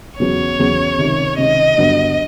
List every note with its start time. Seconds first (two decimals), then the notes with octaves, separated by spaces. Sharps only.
0.19 E2 C#3 F#3 B3 C#5
0.59 E2 C#3 F#3 B3
0.98 C#2 C3 D#3
1.37 C#2 C3 D#3 D#5
1.78 G2 D3 F#3 B3